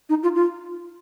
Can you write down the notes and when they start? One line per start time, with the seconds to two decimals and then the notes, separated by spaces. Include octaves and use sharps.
0.09 D#4
0.23 F4
0.35 F4